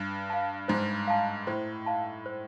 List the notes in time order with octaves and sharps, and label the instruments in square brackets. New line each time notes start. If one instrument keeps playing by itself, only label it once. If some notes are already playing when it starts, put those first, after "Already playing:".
Already playing: [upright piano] G2
[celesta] F5 A5
[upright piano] G#2 [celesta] C5
[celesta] F5 A5
[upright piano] A2 [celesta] C5
[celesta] F5 A5
C5